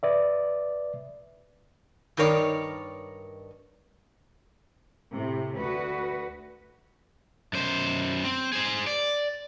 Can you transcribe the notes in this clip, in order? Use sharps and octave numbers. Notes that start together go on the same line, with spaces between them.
B4 D5 E5
G2 D#3 D#4 A#4 C#5 D5
A2 C3
D2 F#4 B4
F#2 C5
C4
G#4 C5
D5